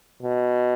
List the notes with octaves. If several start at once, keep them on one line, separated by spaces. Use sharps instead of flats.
B2